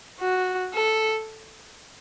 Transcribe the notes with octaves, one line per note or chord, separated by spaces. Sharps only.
F#4
A4